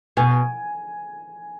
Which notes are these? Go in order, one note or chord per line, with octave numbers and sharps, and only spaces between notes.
B2 G#5